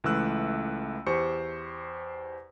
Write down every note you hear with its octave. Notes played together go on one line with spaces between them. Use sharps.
C#2 E3 A3 E6 F#6
E2 G4 C5 C#6 C#7